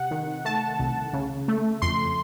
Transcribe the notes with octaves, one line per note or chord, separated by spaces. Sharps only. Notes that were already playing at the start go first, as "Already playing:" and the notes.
Already playing: C3 F#5
D#3
A3 A5
C2
C#3
A3
F2 C6